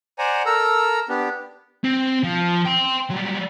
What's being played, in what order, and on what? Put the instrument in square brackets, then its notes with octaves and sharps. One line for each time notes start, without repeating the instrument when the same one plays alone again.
[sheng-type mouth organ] C5 D5 F#5 G#5 A#5
A4 A#4 A#5 E6
B3 D4 G4
[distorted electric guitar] C4
F3
G5 C6
F#3 G3